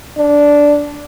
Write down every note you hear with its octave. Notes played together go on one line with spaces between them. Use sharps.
D4